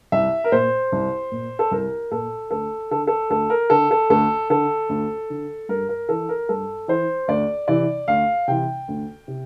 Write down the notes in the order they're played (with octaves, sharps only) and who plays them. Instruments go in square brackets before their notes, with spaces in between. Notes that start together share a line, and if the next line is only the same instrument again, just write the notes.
[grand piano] C2 E5
A#4
A#2 C5
C2
A#2
A4
C2 A#4
A#2 A4
D2 A4
D3 A4
A4
D2 A4
A#4
D3 A4
A4
D2 A4
D3 A4
D2
D3
G2 A#4
A#4
E3 A4
A#4
G2 A4
E3 C5
D2 D5
C3 E3 D5
D2 F5
C3 E3 G5
D2
C3